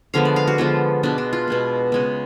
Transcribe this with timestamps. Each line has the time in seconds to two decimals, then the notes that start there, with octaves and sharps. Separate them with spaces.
0.14 D3 F3 G#3 B3 F5
0.25 D5
0.36 F5
0.48 F#4
0.58 D3 F3 G#3 B3 F4
1.03 B2 G#3 B3 D4
1.18 D4
1.33 F4
1.48 B2 G#3 B3
1.92 C#3 G#3 B3